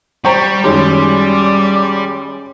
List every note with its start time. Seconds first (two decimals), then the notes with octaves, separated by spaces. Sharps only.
0.25 G3 C5 G5 A#5 C#6
0.64 F#2 D#3 G#3 C#4 D5